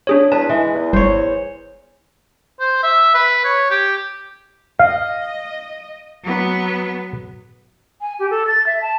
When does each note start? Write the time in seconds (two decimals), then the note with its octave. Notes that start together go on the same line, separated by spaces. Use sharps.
0.07 D4 G#4 C#5
0.32 E2 B4 A5
0.49 E3 G#3
0.74 E2
0.93 G1 C5 C#5
2.60 C5
2.83 E5
3.14 B4
3.45 C#5
3.71 G4
4.79 D#5 F5
6.23 F#3 B3
8.01 G#5
8.19 G4
8.31 A4
8.47 A6
8.66 E5
8.82 A5